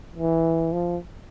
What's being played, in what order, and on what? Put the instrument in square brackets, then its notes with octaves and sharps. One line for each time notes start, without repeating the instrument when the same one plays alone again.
[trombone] E3
F3